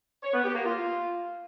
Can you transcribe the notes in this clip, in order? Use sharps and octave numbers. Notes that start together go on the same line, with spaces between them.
C#5
B3
G4
A#3
F4